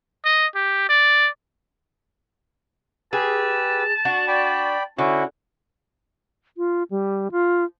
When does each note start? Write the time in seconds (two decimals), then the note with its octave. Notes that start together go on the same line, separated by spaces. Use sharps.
0.25 D#5
0.55 G4
0.89 D5
3.13 G4 G#4 B4 A5 E6
4.05 D4 F#4
4.28 D5 G5 B5
4.98 D3 C#4 E4 F#4
6.57 F4
6.91 G3
7.31 F4